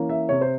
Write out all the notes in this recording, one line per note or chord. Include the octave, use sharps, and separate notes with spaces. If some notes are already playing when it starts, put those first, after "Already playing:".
Already playing: E3 A#3 C#4
E5
C3 C#5
C5